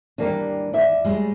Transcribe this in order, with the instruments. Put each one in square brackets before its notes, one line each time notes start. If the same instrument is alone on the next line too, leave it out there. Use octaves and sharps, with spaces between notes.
[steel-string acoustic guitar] D#2 G#2 E3 [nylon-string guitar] G3 A#3 D4
[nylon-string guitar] D5 E5
[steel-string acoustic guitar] A2 G3 G#3